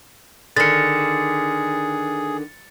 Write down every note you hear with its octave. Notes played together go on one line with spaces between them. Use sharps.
D3 D#3 G#4 A6 C#7